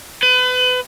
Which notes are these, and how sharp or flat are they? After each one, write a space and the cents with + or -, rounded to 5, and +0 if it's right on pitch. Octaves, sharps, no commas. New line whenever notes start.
B4 +30